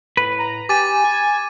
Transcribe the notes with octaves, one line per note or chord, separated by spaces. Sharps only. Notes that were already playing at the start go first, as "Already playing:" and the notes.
A2 B4
A#5
G4 G#5 D6 A6 D#7
G#6